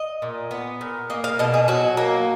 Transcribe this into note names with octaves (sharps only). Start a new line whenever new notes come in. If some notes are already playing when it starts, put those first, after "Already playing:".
Already playing: D#5
A#2
B3
A#2
A#3 D#5
F5
B2 D#5
G#4
F#3 F#4
A#3